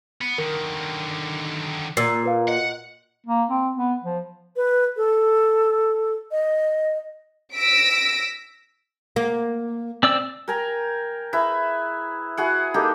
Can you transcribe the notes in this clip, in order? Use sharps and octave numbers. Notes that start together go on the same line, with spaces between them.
B3
D3 D#3 A#4
A#2 E6 C7
A#4 B4 F5
D#5 F#5
A#3
C4
B3
F3
B4
A4
D#5
E6 A#6 B6 D7
A#3
C4 D5 E6
A#4 G5 G#5 A#5
E4 G#4 B4 E5
E4 F#4 G#4 F#5
A#3 D#4 G4 A4